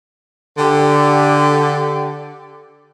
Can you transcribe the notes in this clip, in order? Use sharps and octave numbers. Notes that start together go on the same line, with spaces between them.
D3 G4